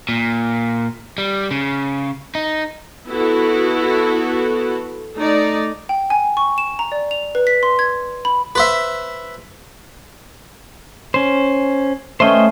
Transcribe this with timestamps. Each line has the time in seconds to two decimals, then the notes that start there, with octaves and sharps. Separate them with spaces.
0.09 A#2
1.18 G3
1.51 C#3
2.35 D#4
3.07 B3 E4 F#4 A4
5.17 A3 D#4 D5
5.89 G5
6.10 G#5
6.37 C#6
6.58 E7
6.79 A#5
6.92 D5
7.11 F7
7.35 B4
7.47 B6
7.63 C6
7.79 G#6
8.25 B5
8.55 B4 C5 E5
11.14 C#4 C5
12.20 A3 C#4 C5 D#5 G5